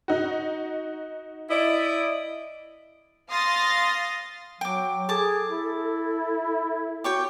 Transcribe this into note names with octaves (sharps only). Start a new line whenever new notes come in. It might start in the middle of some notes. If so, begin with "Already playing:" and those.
D#4 F#4
E4 D5 D#5
F5 C6 D#6 A6 A#6
F#3 G5 D6
G#4 A4 A5 D6
E4
F#4 G4 C#5 G5